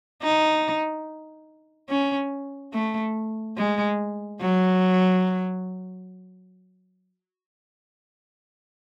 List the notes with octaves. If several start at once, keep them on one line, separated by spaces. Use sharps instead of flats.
D#4
C#4
A3
G#3
F#3